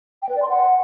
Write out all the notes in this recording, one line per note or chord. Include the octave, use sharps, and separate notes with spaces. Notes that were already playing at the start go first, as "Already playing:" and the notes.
G5
B4
D5
C6
F#5